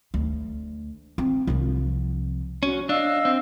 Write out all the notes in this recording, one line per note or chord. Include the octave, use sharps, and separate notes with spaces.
D2
C4
C2 F3
C#4 F#4
D4 D#5 F5 E6
C4